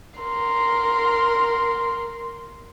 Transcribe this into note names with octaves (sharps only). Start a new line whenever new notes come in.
A#4 C6